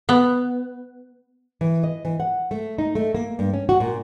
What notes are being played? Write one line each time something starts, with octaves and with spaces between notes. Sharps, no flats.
B3
E3
D#5
E3
F#5
A3
D#4
A3
A#3
G2
C#4
F#4
A#2